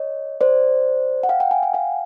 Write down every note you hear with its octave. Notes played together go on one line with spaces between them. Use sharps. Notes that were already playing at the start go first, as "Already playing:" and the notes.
Already playing: C#5 D#5
C5 D5
F#5
F5 G5
F5 G5
F#5 G#5
F#5 G#5
F5 G5